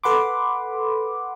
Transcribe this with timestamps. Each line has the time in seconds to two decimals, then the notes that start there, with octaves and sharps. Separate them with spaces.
0.04 A4 B4 F#5 B5 C6 D6